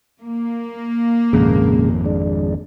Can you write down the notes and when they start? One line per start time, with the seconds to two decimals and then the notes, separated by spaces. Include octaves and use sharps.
0.20 A#3
1.33 G#1 F2 A#2 C#3 G#3
2.05 G#3 D4